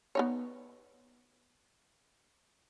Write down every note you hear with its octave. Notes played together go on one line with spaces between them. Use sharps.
B3 D#4 C#5